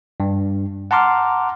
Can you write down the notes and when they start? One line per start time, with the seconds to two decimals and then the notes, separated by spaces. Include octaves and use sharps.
0.20 G2
0.91 F#5 A5 A#5 C6 D6 F6